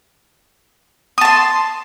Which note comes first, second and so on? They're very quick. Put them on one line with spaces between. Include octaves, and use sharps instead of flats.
D#6 A5 C6